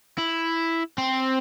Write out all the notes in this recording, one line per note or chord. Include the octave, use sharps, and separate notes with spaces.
E4
C4